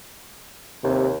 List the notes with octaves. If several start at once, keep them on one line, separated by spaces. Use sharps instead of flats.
D#2 C3